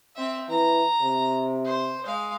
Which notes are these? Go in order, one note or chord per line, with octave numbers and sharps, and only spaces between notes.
C4 E5
E3 A#5
C3
C5
G#3 F5